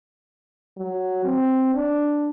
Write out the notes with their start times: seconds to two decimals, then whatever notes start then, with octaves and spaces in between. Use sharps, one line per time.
0.77 F#3
1.24 C4
1.74 D4